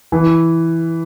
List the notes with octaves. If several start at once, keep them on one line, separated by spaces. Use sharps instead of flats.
E3